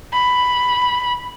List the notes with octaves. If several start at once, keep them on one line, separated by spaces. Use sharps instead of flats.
B5